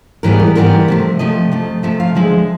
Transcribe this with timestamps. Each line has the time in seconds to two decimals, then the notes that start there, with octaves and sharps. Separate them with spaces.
0.23 G#2 E3 G3 B3 A#4
0.40 A#4
0.55 G#2 E3 G3 B3 A#4
0.88 C3 F3 A3
1.19 C3 F3 A3 D#5
1.52 C3 F3 A3
1.83 C3 F3 A3 E5
2.00 F5
2.15 D3 F3 G#3 E5